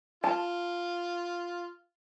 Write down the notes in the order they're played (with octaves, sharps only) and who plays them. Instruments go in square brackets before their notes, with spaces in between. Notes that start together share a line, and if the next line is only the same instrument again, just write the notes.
[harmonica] F4 [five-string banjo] A5